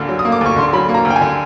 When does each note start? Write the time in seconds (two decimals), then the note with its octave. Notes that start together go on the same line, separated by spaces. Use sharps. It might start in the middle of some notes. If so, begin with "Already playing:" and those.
Already playing: D2 D3 A#3
0.09 F#3
0.19 D#6
0.25 A#3
0.32 D6
0.41 D2 C#6
0.56 D3 C6
0.73 F#3 B5
0.89 A#3
0.94 A#5
1.05 D2
1.10 G5
1.16 G#5
1.21 D3